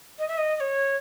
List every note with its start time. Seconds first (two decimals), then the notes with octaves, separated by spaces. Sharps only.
0.18 D#5
0.28 E5
0.38 D#5
0.56 D#5
0.60 C#5